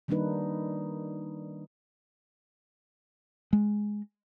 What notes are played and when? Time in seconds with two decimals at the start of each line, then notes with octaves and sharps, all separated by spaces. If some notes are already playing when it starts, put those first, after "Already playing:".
0.08 D#3 G3 A#3 D4 D#4 B4
3.53 G#3